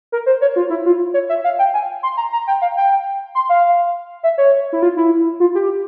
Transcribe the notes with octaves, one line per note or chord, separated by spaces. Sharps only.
A#4
C5
C#5
F4
E4
F4
C#5
E5
F5
G5
G#5
C6
A#5
A#5
G5
F5
G5
C6
F5
E5
C#5
E4
F4
E4
F4
G4